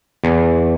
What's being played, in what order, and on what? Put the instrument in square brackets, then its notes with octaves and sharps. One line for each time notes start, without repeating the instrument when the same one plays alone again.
[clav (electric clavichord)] E2